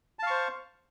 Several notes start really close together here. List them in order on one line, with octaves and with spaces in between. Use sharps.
A5 F5 C#6 C5